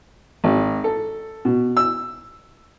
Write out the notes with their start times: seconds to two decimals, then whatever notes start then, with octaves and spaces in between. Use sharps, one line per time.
0.44 G#1
0.84 A4
1.45 B2
1.77 E6